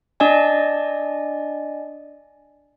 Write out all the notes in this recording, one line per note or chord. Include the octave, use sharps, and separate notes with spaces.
D4 D5 D#5 G#5